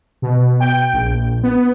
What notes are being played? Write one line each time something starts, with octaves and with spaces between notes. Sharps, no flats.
B2
G5
A#1
B3